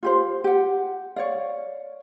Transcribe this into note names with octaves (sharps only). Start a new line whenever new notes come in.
F4 G4 C5
G4 F#5
C#5 D5 F5